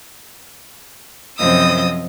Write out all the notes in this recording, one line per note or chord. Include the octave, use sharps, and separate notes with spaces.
F#2 C3 F3 D#5 D#6 E6